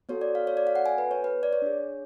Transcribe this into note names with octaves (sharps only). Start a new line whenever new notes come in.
B3 F#4 A4 C#5
D5
F5
C#5
D5
F5
F#5
G#5
B4
C#5
B4
D5
C#5
D4 G#4